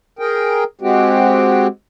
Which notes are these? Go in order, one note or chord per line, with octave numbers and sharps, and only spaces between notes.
G#4 A#4 G5
G#3 C4 F#4 G4